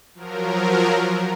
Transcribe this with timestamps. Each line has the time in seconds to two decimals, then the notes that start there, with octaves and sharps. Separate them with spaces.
0.15 F3 F#3 A#4